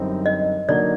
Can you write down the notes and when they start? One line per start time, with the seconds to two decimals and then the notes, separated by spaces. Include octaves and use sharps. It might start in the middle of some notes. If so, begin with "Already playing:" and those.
Already playing: F#2 D3 G3 C4 D#4
0.26 D#5
0.69 D3 F#3 A#3 D#4 D5